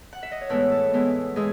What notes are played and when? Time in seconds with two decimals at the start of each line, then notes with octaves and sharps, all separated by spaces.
0.13 F#5
0.23 E5
0.32 D#5
0.41 C#5
0.50 A2 E3 G#3 B3 B4
0.71 A4
0.94 A2 E3 G#3 B3
1.36 A2 E3 G#3 G#4